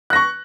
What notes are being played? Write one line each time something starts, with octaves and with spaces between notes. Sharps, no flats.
C#6 F#6 A#6